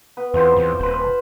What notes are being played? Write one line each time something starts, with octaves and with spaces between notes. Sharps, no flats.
B3 B4
E2 C4 F4 C5
E2
D#1 B4 C5